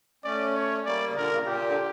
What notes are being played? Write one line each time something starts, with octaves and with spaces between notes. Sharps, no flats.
A3 C#4 D5
C#5
G3 A#3 D5
C#3
A#2 D3 A#4
C#3
C#3
A#2 G4
D3